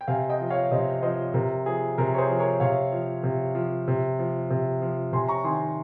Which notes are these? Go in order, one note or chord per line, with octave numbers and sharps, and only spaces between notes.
G5
C3 F5 G#5
D#5 G5
F3
C#5 F5
C3 C5 D#5
F3 C5 D#5
C3 A#4
F3 G#4
C3 A#4
C#5
G#4 C5
F3
A#4 C#5
C3 C#5 F5
F3
C3
F3
C3
F3
C3
F3
C3 G#5 C6
A#5 C#6
D#3 G#5 C6